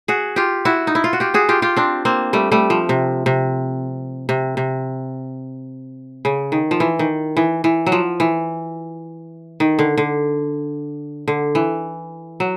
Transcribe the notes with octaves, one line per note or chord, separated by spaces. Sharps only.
F#4 G#4
F4 G4
E4 F#4
D#4
E4
F4
F#4
F4 G4
F#4 G#4
F4 G4
F4 G4
C4 D4
A#3 C4
G3 A3
G3 A3
F3
C3
C3
C3
C3
C#3
D#3
F3
E3
D#3
E3
E3
F#3
F3
E3
D#3
D3
D3
D3
E3
F#3